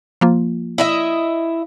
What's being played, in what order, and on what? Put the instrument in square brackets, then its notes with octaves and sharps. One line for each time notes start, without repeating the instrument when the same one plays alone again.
[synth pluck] F3 A#3 F4
[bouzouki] E4 D#5 E5